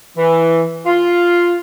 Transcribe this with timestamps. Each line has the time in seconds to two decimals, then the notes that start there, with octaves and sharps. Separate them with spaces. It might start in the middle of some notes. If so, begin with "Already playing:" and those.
0.18 E3
0.86 F4